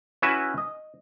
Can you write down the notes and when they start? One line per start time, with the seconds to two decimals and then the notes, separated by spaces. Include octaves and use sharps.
0.22 C#4 E4 F#4 B4 E5
0.58 D#5